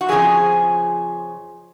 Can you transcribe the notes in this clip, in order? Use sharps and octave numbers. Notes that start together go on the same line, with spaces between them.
F#4
F2 C#3 F3 G#4